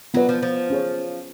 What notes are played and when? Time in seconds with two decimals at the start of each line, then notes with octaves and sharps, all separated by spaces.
0.14 F#3 B3 F4 B4 D5
0.29 F3
0.43 F3
0.70 C#4 G#4 C#5